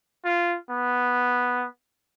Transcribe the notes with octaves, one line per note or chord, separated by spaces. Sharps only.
F4
B3